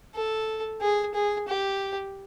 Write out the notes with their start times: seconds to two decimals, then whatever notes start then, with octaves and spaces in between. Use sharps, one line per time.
0.15 A4
0.81 G#4
1.14 G#4
1.48 G4